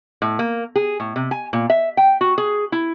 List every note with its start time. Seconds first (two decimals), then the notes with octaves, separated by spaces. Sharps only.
0.22 A2
0.39 A#3
0.76 G#4
1.00 A2
1.16 C3
1.31 G#5
1.53 A#2
1.70 E5
1.97 G5
2.21 F#4
2.38 G#4
2.72 E4